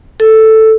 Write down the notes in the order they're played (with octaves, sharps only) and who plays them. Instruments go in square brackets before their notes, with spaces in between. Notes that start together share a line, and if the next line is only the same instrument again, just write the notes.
[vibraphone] A4